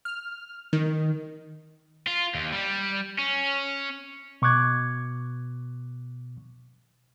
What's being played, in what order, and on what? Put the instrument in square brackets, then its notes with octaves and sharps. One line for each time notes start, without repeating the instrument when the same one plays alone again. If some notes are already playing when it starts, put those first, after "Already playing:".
[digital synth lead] F6
D#3
[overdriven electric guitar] F4
D#2
G3
C#4
[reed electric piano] B2 C#6 D6 F#6 G#6